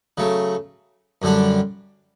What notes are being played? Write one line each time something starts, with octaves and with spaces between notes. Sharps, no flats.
C#3 F#3 A3
F#2 D3 G3 D4